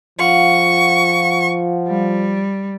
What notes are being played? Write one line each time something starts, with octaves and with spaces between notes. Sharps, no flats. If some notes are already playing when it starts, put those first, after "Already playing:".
F3 F4 F5 F#5 C#6
G3